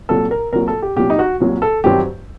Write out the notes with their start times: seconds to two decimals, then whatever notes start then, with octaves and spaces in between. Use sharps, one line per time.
0.09 C2 A#2 F#3 A4
0.31 A#4
0.52 C2 A#2 F#3 A#4
0.68 A4
0.82 G4
0.96 C2 A#2 F#3 G4
1.10 D#4
1.19 F#4
1.40 C2 A#2 F#3
1.62 A4
1.84 G2 D#3 F#3 C4 G4